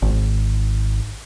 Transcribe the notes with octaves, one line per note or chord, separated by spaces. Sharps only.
G#1